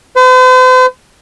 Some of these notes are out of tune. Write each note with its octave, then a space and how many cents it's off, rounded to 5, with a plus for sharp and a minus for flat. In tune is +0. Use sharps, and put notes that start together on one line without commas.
C5 -45